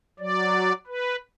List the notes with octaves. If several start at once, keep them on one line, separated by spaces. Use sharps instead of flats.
F#3 D5
B4